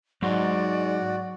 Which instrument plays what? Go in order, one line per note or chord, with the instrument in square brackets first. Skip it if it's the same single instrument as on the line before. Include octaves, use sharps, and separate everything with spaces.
[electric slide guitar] G#2 [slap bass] F#3 [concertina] F#4 [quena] D5